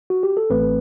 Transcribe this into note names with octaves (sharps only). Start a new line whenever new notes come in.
F#4
G4
A4
A1 A2 E3 A3 C4 B4